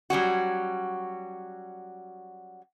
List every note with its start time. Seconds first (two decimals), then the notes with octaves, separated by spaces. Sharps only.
0.10 F#3 G3 C#4 F#4